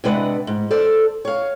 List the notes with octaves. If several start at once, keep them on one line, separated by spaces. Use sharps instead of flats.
C3 G#3 D4 B4 F#5
G#2
A4 C5 D5
C#5 F5